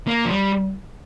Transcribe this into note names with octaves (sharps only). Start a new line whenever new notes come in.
A#3
F3
G3